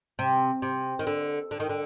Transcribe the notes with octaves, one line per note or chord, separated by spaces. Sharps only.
C3
C3
D#3
D3
D3
D#3
D3